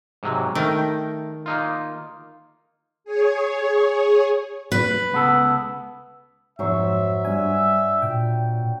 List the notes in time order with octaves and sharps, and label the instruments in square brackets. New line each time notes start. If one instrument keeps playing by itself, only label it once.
[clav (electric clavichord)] G#2 C3 F#3
[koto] D#3 [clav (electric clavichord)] A3 A#4 G5
[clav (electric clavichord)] A#3 D#4 F4
[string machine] G#4 C#5
[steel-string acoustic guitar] B4
[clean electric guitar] C#2 B3 A4
[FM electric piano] F2 G#2 [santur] F#3 C5 C#6 [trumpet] E5
[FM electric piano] G2 G#5 [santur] D4
[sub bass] A#2 [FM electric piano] G5